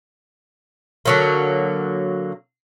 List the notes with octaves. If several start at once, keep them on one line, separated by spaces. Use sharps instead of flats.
D3 F#3 A#3